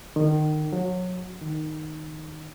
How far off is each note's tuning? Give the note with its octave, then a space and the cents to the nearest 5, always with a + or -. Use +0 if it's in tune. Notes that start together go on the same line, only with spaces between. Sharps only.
D#3 -25
F#3 -25
D#3 -5